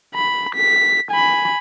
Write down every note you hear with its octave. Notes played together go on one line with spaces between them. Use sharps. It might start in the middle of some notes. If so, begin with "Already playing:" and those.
B5
B6
G#5 B5